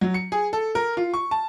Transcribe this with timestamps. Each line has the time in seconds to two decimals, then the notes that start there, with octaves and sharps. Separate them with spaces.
0.01 F#3
0.14 C#7
0.32 G#4
0.53 A4
0.75 A#4
0.97 F4
1.14 C#6
1.31 A5